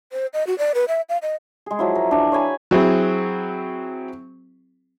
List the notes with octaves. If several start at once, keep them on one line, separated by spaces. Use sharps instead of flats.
C5
D#5
F#4
D5
B4
E5
F5
D#5
G#3 G#4
F3 F#3 E4
A#4
E3 D4
C#5 F5 G#5 B5
F#3 C4 E4 G#4